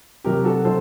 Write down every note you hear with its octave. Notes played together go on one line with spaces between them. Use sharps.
C3 F#3 G4 A#4
F#4 A4
C3 F#3 A4 C5